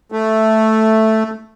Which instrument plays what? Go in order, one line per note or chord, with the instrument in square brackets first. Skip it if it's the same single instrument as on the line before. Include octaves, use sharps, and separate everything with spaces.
[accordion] A3